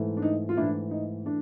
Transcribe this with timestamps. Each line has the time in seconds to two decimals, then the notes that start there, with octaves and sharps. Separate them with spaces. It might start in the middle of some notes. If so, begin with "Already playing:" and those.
Already playing: G#2 E3 A3
0.17 D4
0.22 D#4
0.49 F4
0.57 G#2 E3 A3 D4 E4
0.91 D#4
1.25 E3 A3 D4